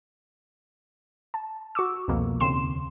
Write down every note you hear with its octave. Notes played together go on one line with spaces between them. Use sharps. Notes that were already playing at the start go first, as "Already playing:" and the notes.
A5
F#4 C#6 D6 E6
C2 F2 B2 A#3
D#2 C#3 C4 C6 E7